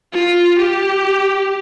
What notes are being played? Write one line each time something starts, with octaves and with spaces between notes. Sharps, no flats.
F4
G4